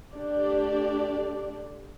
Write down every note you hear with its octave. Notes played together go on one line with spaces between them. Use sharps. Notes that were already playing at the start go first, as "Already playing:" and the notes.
A3 D4 G4 D5